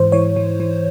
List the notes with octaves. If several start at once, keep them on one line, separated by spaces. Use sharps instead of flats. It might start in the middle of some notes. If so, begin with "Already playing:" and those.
Already playing: G#2 E3 C5
E3 C#5
E3
E3